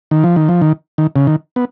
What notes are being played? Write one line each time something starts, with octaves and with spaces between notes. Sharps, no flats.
D#3
F3
D#3
F3
D#3
D#3
C#3
D#3
B3